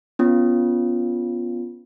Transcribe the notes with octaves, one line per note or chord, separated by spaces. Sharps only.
B3 C#4 F4